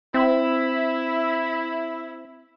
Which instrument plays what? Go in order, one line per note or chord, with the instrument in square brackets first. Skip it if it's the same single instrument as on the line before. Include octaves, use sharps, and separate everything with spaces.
[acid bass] C4 [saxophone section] E4